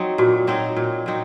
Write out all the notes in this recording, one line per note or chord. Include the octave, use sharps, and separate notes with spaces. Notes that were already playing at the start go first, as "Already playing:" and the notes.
Already playing: F#3 C4 D#4
A#2 F#4
F#3 C4 D#4
A#2
F#3 C4 D#4